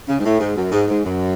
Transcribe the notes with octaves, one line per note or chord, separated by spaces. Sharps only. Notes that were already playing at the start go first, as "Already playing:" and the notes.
C#3
G#2
A2
G#2
F#2
G#2
G#2
F#2